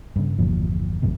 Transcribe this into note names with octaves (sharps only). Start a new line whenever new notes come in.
G2 C#3
G1 E2 A#2 F3
A1 F#2 A2 C3